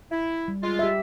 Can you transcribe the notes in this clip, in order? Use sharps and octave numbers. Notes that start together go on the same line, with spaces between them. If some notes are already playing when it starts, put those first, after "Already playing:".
E4
G3
G#3 F4
G4 E5